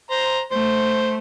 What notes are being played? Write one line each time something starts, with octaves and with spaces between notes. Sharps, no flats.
C5 A#5
A3 C5